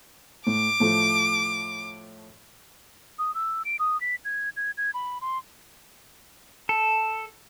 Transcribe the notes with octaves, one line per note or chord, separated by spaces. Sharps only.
A2 D6
A2 F3 A3
D#6
E6
D7
D#6
B6
G#6
G#6
G#6
B5
C6
A4